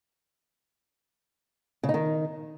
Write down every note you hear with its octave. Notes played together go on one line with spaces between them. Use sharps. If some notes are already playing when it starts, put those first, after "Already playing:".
C#3
D#4
D#3